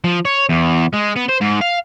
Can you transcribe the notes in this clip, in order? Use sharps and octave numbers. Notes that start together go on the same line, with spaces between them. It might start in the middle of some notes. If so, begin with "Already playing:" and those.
F3
C#5
E2
G#3
B3
C5
G#2
F5